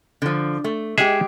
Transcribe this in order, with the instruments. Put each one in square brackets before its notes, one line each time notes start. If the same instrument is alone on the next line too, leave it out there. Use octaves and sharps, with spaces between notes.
[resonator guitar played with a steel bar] D3 F3
A3
[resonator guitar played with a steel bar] G#3 G4 [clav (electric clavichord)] G#4 E5 F#5